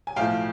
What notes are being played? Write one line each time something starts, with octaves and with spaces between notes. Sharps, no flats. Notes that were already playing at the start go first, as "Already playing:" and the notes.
G#5
B1 A2 F3 A3 F5 G5